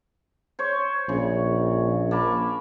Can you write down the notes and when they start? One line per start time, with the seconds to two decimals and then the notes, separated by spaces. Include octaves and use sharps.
0.59 C5 C#5
1.09 A#1 C#3
2.11 A#3 A5 B5